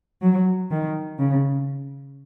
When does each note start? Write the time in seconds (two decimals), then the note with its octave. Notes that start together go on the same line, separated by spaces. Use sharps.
0.21 F#3
0.70 D#3
1.18 C#3